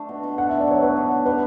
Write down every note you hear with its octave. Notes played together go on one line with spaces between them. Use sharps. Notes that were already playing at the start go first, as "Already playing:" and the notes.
Already playing: A3 D4
B2
B2
D3 F#5
E4 E5
D5
F#3 C#5
B3 B4
D3
E4
G3 B4